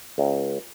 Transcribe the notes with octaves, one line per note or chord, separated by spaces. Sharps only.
C#2